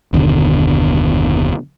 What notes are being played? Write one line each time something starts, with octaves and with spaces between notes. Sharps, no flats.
F#1 D#2 B2 D3